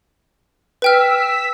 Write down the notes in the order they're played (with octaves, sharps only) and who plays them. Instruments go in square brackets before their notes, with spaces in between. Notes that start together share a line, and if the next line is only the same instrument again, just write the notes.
[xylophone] B4 G5 F6 [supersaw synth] E6 B6